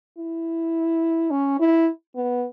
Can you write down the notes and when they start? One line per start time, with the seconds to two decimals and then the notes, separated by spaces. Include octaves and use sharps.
0.18 E4
1.31 C#4
1.60 E4
2.16 B3